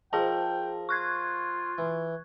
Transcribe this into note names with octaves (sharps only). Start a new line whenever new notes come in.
F3 G#4 A#4 D#5 G5 A5
F4 C#6 F#6 G#6
E3